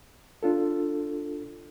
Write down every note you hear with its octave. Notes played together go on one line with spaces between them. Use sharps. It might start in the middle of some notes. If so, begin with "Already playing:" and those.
D4 F4 A4